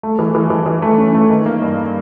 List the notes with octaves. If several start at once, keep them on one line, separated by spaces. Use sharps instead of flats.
A3
E3
E3
E3
E3
A3
C#4
A3
D#3
A#3
G2